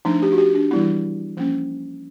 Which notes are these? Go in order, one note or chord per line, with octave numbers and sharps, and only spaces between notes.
F3 A3 D4 D#4
G4
F#4
G4
D4
E3 G3 B3 E4
F3 A#3 C#4